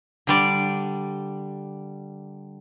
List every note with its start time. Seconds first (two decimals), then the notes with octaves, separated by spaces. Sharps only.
0.27 D3 G3 D5